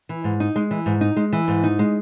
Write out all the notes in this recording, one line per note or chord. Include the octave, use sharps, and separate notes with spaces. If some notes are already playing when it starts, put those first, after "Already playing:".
E3
G#2
D#4
G#3
E3
G#2
D#4
G#3
E3
G#2
D#4
G#3